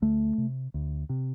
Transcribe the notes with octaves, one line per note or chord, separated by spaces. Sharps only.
D2 A3
C3
D2
C3